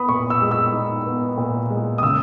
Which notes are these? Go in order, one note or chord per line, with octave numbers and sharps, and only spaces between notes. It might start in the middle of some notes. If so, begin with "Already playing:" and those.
Already playing: B3 B5 D#6
A#2 C#6
E6
G#3
E6
D#4
B3
A#2
G#3
D#6
C#3 E6